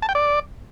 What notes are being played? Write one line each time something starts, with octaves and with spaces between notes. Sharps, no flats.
A5
G5
D5